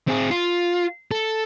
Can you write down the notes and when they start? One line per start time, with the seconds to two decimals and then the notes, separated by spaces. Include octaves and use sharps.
0.08 C4 G#4
0.31 F4
1.11 A4